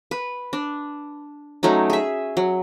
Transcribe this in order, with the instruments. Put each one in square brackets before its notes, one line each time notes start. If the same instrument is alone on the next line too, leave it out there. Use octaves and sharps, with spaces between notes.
[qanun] B4
D4
F#3 A3 C#4 D#4
G#4 E5
F#3